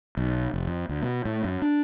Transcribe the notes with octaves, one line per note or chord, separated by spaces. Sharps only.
B1
F1
F2
D2
B2
A2
F#2
D4